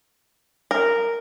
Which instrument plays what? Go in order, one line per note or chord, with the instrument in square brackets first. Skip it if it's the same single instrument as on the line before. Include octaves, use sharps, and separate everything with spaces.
[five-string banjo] A#4